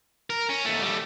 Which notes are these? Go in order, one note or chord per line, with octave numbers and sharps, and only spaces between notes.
A#4
C#4
D#2 A3
G3 A3